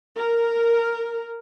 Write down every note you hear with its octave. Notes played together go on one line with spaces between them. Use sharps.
A#4